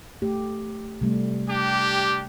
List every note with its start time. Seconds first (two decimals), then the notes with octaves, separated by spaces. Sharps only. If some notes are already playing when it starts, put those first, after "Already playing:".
0.22 A3 G4
1.01 C3 G3 A3
1.48 D4 G4